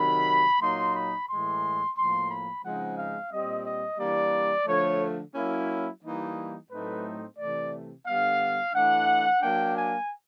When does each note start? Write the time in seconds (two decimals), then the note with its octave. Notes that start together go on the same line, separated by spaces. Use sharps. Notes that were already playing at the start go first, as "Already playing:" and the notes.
Already playing: C3 D#3 F#3 B5
0.60 A#2 F#3 A#3 D#4 C6
0.94 B5
1.28 A2 E3 G#3 C6
1.95 A2 F3 A#3 C6
2.30 B5
2.63 C#3 F3 G#3 C4 D#4 F#5
2.97 F5
3.32 A#2 G3 C4 D#5
3.65 D#5
3.99 E3 G3 A#3 D4 D5
4.67 D3 F3 A3 C#5
5.35 F#3 A#3 C#4 E4
6.03 E3 G3 A#3 D#4
6.70 A2 F#3 A3 C4 D#4 B4
7.38 C3 E3 A3 D5
8.06 D3 G3 B3 F5
8.74 E3 A3 D4 F#5
9.41 F#3 A#3 D4 G5
9.75 G#5